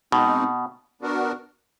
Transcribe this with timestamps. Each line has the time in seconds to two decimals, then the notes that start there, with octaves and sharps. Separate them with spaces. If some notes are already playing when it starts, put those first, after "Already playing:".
0.12 B2 G#3 C4 D#4
1.01 B3 D4 F#4 A#4